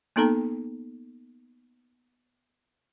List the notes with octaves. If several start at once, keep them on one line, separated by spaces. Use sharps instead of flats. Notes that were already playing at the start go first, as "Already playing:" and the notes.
A#3 B3 D#4 A4 A5 A#5